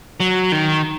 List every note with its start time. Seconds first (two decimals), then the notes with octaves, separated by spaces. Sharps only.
0.20 F#3
0.52 D#3